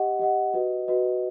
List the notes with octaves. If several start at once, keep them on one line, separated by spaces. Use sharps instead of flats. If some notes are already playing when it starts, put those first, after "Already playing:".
Already playing: G4 D#5 F#5
G4 D#5 F#5
F#4 B4 D#5
F#4 B4 D#5